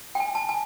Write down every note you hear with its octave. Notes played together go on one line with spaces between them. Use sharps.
G5
G#5
A5
G#5